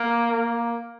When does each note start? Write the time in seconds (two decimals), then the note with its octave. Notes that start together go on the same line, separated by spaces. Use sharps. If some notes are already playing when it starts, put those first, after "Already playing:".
Already playing: A#3
0.31 A#3